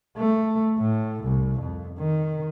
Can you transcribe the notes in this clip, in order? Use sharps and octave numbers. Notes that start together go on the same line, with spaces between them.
A3
A2
C2
F2
D#3